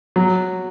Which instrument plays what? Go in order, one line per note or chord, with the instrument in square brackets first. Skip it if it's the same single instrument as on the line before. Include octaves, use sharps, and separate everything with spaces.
[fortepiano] F#3